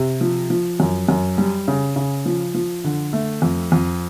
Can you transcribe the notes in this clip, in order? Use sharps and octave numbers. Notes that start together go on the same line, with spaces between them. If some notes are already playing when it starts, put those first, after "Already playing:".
Already playing: C3
F3
F3
F#2
F#2
G3
C#3
C#3
F3
F3
D3
A3
F2
F2